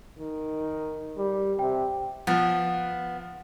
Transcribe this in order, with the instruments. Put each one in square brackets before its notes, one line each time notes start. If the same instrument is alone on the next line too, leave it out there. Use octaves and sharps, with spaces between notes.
[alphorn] D#3
G3
[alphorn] C3 [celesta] G5
[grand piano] F3 [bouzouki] B3